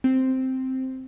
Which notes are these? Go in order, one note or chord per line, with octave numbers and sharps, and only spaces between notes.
C4